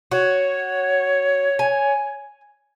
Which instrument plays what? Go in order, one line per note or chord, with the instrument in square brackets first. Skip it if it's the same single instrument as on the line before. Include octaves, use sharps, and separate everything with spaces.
[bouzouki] F#4 [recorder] C#5
[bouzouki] G#5